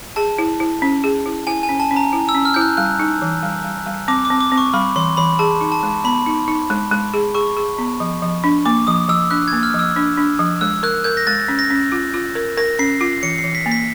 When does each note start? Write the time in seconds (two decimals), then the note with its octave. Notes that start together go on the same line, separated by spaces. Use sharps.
0.16 G#4 A5
0.38 E4
0.60 E4
0.82 C#4
1.04 G#4
1.26 E4
1.47 E4 G#5
1.63 G#5
1.69 C#4
1.80 A5
1.91 C#4
1.96 A#5
2.13 E4
2.29 E6
2.34 C#4
2.45 F6
2.54 E4 G6
2.61 F#6
2.77 G3 F#6
2.99 D#4
3.22 E3
3.43 G3
3.65 G3
3.86 G3
4.08 C4 D6
4.25 D6
4.30 C4
4.41 D6
4.52 C4
4.58 C#6
4.74 G3 B5
4.96 E3 C6
5.17 E3 B5
5.39 G#4 A5
5.61 D#4
5.72 A5
5.83 G#3
6.04 B3 B5
6.26 D#4
6.48 D#4
6.70 G#3
6.91 G#3
7.14 G#4
7.34 G#4 C#6
7.57 G#4
7.78 B3
8.00 F3
8.22 F3
8.44 D4
8.66 A#3 D6
8.87 F3 D#6
9.09 F3 E6
9.31 D4 F#6
9.48 A#3 G#6
9.63 F6
9.74 F3 E6
9.96 D4
10.18 D4
10.39 F3
10.61 G#3 E6
10.83 A#4 F#6
11.04 A#4 G6
11.17 A#6
11.27 G#3 A6
11.48 C#4
11.59 A#6
11.70 C#4
11.92 F4
12.14 F4
12.35 A#4
12.57 A#4 A#6
12.79 C#4 C7
13.01 F4 C7
13.23 E3 C#7
13.38 C7
13.44 E3
13.55 B6
13.66 A#3
13.72 B6